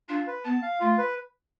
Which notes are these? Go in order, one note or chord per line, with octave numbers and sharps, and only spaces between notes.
D4 F4
B4
B3 A5
F5
A3 F4
B4